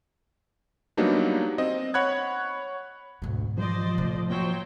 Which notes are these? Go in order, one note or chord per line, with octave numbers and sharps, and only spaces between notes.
F#3 G3 A#3 B3 D4 D#4
C4 D#5
C#5 F#5 B5 F#6 G#6
D2 G#2 B2
E3 F3 G3 G#3 C5 D5 D#5
A2 C3
F#3 A#3 C5 G5